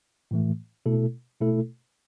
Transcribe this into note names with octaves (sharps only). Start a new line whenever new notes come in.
A2 E3 A3
B2 A3 E4 A4
B2 A3 E4 A4